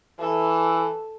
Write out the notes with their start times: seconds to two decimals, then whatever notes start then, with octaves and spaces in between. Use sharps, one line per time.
0.19 E3 A4